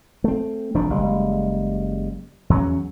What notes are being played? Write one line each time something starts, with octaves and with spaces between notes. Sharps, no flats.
A3 C4
E1 F3 D4
F#1 G3 G#3
E2 F#3 C#4